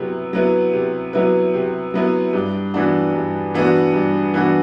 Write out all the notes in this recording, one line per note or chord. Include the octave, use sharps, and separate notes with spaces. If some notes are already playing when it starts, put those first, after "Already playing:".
Already playing: C3 F#3 B3 E4 B4
F#3 B3 E4 B4
C3
F#3 B3 E4 B4
C3
F#3 B3 E4 B4
G2
E3 B3 D4 F#4
G2
E3 B3 D4 F#4
G2
E3 B3 D4 F#4